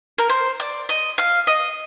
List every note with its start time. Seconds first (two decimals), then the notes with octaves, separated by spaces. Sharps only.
0.18 A#4
0.29 C5
0.60 D5
0.89 D#5
1.18 F5
1.47 D#5